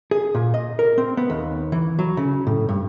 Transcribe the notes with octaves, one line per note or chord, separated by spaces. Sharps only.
G#4
A#2
D#5
A#4
C4
B3
D#2
E3
F#3
C#3
A2
G2